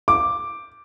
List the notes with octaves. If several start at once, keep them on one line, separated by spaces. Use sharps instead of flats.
D6